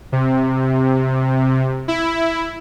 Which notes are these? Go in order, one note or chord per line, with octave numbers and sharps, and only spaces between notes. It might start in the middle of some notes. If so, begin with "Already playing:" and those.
C3
E4